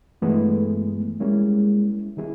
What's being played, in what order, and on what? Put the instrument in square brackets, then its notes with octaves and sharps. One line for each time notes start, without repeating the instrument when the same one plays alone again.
[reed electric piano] G2 E3 G#3 B3 [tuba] A3
[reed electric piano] G3 A#3 C#4 E4 [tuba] G#3
[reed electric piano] D#3 G3 B3 E4 G#4